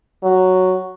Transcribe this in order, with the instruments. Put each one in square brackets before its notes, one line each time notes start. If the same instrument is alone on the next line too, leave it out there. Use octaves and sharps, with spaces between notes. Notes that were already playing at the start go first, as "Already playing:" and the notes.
[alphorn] F#3